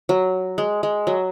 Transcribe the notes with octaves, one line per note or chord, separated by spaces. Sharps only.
F#3
G#3
G#3
F#3